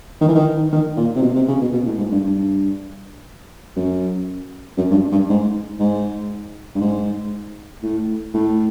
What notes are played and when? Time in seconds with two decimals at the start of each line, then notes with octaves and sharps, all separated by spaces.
0.21 D#3
0.29 E3
0.35 D#3
0.72 D#3
0.97 A#2
1.16 C3
1.22 B2
1.35 C3
1.48 C#3
1.61 B2
1.73 B2
1.86 A2
1.98 G#2
2.12 G2
2.24 G2
3.76 F#2
4.78 F#2
4.91 G2
4.94 F#2
5.12 G2
5.29 G#2
5.80 G#2
6.75 G2
6.81 G#2
7.83 A2
8.34 A2